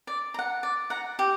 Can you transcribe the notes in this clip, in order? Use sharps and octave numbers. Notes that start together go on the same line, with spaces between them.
D5
A#5
F#5
D5
F#5 A#5
G4